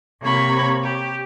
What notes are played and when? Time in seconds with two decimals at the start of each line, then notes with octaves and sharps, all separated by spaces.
0.21 C3 A#3 C#5 B5 C#6
0.82 G4